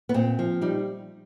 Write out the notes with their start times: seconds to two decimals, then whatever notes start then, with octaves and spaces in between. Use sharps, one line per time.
0.09 B3
0.14 A#2 C4
0.39 F3
0.62 G3 D#4